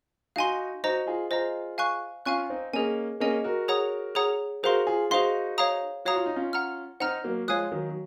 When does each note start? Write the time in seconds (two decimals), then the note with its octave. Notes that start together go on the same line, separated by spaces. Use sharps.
0.36 D#4 F#4 F5 G#5 C6
0.84 D#4 F#4 C5 D#5 A#5
1.07 F4 G#4
1.31 F4 G#4 C5 D#5 A#5
1.78 F5 G#5 C#6 F#6
2.26 C#4 F4 F5 G#5 C#6 F#6
2.50 C4 D#4
2.73 A#3 C#4 G#4 D#5 G#5
3.20 A#3 C#4 G#4 D#5 G#5
3.44 F#4 A#4
3.68 G#4 C#5 F#5 A#5 D#6
4.15 G#4 C#5 F#5 A#5 D#6
4.63 F#4 G#4 A#4 C5 F5 C6
4.87 F4 G#4
5.10 D#4 F#4 G#4 C5 F5 C6
5.58 C#5 F5 A#5 D#6
6.05 F#4 C#5 F5 A#5 D#6
6.16 F4
6.26 D#4
6.36 C#4 F4
6.53 F#5 A#5 F6
7.00 C4 D#4 F#5 A#5 F6
7.24 F#3 A#3
7.48 F3 G#3 C#5 F5 G#5 D#6 F#6
7.72 D#3 F#3
7.89 F#3